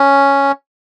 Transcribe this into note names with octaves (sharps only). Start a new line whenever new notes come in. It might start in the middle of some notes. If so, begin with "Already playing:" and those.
Already playing: C#4